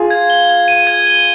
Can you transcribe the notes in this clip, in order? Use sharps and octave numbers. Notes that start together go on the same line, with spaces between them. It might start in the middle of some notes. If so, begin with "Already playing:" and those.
Already playing: F4 G#4
G#6
G7
G#6
D#7
G#6
G7